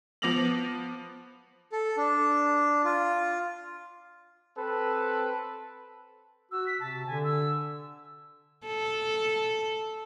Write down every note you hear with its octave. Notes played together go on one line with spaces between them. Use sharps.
F3 B3 D6 A#6 F7 F#7
A4
D4
F4
C4 A4 B4
F#4 E6
B6
C3 A5
D3 G#5
E6
A4